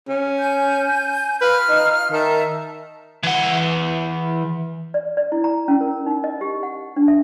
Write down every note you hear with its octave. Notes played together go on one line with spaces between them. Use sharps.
C#4
G#5 G6
F4 B4 F6
D#4
D#3 E5 A5 A#5
E3 F#5
D5
D5
E4
A#5
C#4
A#4
D#4
D#5
G4
F#5
D4
E5